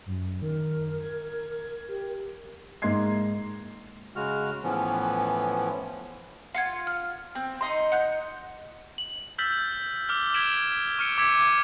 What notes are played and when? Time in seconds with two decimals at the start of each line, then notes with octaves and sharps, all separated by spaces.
0.06 F#2
0.42 D#3 A#4
1.00 G#6
1.89 G4
2.82 G#2 A#3 D#5 C6 G#6 C7
4.16 C#3 G#3 F#4 F6
4.64 A2 E3 F3 B3 C#4
6.55 F4 F5 F#5 G#6
6.87 F6
7.35 C4
7.61 D#4 D#5 C6
7.92 F#5 F#6 G6
8.98 F#7
9.38 E6 F6 G6 A6 B6 F#7
10.09 D6 F6 G7
10.34 G#6 B6 D7 E7 F#7
10.99 C#6 F6 C#7 D7
11.18 D6 E6 G#6 B6